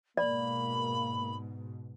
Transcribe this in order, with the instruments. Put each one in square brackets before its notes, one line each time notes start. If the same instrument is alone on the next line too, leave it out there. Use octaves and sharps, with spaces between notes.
[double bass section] G#2 B2 [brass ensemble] A#3 [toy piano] D5 [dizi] B5